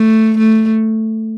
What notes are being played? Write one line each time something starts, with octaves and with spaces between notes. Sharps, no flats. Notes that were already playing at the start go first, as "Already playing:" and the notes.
Already playing: A3
A3